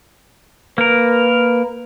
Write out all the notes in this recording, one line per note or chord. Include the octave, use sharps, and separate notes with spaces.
A#3 A#4 B4